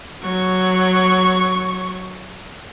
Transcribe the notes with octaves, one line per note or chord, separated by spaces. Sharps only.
F#3 C#6